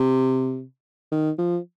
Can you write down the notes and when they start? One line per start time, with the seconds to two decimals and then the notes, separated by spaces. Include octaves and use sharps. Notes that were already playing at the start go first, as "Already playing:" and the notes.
Already playing: C3
1.12 D#3
1.39 F3